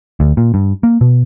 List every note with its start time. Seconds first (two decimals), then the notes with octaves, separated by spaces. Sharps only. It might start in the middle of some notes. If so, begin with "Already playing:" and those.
0.20 D2
0.37 A#2
0.54 G2
0.83 A#3
1.01 B2